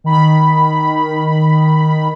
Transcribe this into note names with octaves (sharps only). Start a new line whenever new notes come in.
D#3 B5